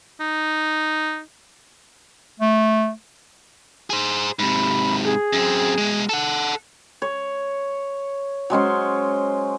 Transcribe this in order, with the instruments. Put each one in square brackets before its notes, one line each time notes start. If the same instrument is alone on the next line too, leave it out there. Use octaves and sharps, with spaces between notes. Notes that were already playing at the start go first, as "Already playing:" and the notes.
[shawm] D#4
[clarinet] A3
[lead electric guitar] G#4 C5
[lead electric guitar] G#2 C3 [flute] B5
[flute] G#4
[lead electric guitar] F#2 C4
B2 G#3
A4 F#5
[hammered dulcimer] C#5
F#3 G#3 C#4 C5